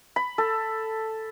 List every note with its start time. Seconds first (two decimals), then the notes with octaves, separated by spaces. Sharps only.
0.16 B5
0.38 A4